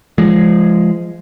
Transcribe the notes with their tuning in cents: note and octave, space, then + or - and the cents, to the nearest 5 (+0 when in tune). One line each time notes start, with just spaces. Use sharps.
F3 -25 G#3 +0